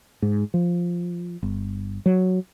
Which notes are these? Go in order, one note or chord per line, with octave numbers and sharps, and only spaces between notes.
G#2
F3
G1
F#3